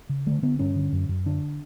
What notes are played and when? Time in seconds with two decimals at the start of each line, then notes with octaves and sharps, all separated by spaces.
0.09 C#3
0.26 D3 A3
0.42 D3 B3
0.59 G2 C#4
0.76 D3
0.93 F#2
1.09 F#2
1.26 D3 D4